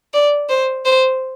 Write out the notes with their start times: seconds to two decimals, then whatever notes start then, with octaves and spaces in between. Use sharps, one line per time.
0.14 D5
0.49 C5
0.85 C5